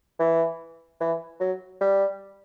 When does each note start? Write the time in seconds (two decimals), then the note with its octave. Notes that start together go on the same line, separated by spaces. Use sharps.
0.19 E3
1.00 E3
1.40 F#3
1.81 G3